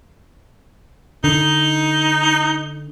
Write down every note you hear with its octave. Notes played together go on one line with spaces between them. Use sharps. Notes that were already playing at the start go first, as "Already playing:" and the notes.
D3 D#4